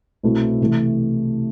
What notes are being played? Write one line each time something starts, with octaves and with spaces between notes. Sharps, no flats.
C2 B2 A3 C4 E4
C3 E3 A3